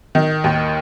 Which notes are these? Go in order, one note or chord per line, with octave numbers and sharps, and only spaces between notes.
D#3
D#2